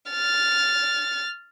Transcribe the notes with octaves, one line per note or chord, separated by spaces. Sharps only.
F6 A6